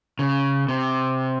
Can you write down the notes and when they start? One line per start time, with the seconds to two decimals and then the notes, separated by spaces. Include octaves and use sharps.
0.19 C#3
0.69 C3